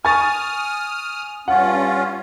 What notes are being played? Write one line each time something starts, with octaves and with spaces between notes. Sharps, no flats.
G#5 C#6 D#6 F6 A6
G2 C#4 F4 F#5